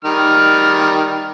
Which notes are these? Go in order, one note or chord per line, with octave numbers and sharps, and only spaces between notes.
D#3 G3 F6